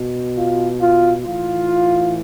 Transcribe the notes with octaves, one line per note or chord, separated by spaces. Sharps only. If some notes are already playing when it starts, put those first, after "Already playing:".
Already playing: B2
F4
F4
A2 E3 F4